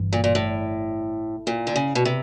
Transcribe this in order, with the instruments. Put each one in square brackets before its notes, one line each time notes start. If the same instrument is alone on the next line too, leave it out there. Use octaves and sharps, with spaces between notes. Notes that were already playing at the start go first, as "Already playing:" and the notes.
Already playing: [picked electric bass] G1 G2 E3
[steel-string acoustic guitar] A#2
A#2
A2
A#2
D3
C#3
B2
C3